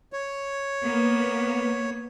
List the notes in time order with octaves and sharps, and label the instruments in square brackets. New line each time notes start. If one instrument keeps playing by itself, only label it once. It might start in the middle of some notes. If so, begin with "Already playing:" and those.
[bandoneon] C#5
[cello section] A#3 B3